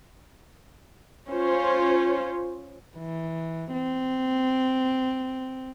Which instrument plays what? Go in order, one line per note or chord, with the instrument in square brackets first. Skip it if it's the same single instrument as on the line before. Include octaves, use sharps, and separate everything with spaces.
[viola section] C#4 F4 C5 C#5
[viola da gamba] E3
C4